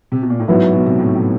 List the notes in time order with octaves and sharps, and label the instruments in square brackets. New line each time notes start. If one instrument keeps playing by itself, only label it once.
[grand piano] C3
B2
A#2
A2
[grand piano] G#2 [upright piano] F#3 B3 E4
[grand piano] B2
C3
A2
A2